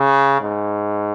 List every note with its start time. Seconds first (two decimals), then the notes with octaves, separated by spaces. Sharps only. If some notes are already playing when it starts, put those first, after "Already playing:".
Already playing: C#3
0.41 G#2